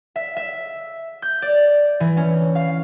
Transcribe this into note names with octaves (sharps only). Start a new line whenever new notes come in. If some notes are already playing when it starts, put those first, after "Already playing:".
E5
E5
G6
D5
E3
C#4
F5